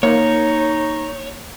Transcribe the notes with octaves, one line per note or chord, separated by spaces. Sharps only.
A#3 D#4 C#5